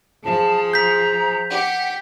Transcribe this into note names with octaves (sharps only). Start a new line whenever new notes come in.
F3 G#4 A5
A#5 G6 B6
G4 F#5